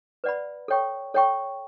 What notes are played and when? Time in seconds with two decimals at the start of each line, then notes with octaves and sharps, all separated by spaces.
0.24 B4 D5 F#5 B5
0.68 A4 C#5 G5 C#6
1.14 A4 C#5 G5 C#6